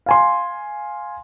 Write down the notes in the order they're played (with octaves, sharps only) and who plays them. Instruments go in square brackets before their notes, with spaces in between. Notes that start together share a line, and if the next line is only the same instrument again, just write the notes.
[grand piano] F5 G#5 C6